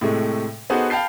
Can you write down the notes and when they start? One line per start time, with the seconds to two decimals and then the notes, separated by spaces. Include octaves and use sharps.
0.01 A2 C3 G#3 A3
0.70 B3 D#4 F#4 G#4 A4 C5
0.90 F5 G5 A5 B5 G6 C7